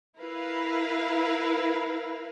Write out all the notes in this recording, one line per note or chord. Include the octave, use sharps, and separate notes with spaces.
E4 A#4 B4 F5